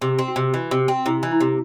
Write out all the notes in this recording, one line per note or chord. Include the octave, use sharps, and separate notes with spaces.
C3 G#4
C4
F#4
C3
E3 F#4
C3
C4
C3 E4
E3
E4
C3